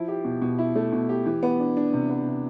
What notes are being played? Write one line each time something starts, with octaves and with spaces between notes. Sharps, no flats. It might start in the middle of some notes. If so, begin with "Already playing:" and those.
Already playing: F3 E4
G4
B2
B2
E4
A3
B2
G4
E3
B3
D4
D4
C3
B3
C3